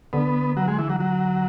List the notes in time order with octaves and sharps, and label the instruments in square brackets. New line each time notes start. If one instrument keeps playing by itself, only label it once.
[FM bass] D3 [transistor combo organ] B3
[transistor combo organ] F#3
G#3
E3
F#3
F#3